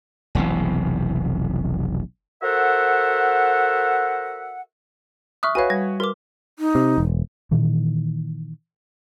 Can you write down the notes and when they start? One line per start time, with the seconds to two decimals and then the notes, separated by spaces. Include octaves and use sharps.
0.35 F1 B1 C3 E3
2.42 F#4 A4 A#4 C5 E5 F#5
5.43 E5 C#6 D#6 F6 F#6
5.55 F#4 B4 C#5 F5 G#5
5.70 G3 G#6
6.00 F#4 A#4 B4 D6
6.59 D#4
6.75 C3
6.98 E1
7.51 A#2 D#3 E3